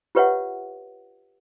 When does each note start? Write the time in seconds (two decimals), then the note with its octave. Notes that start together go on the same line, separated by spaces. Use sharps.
0.15 F4 G4 B4 C#5 E5 F#5